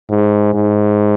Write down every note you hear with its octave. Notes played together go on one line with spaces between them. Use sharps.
G#2
G#2